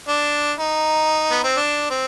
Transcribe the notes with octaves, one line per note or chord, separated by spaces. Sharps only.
D4
D#4
B3
C4
D4
C4